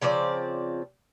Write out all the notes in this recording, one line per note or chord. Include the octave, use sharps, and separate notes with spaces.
C#3 F3 C4 D5